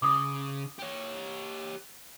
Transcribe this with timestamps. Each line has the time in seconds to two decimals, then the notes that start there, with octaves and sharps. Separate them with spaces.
0.02 C#3 D6 D#6
0.79 G4 C#5